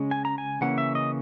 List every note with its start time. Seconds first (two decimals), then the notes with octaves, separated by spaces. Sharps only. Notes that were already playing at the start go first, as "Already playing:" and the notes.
Already playing: C#3 G#3 C#4
0.11 G#5
0.25 A#5
0.38 G#5
0.61 C#3 E3 A#3 C#4 F#5
0.78 E5
0.95 D#5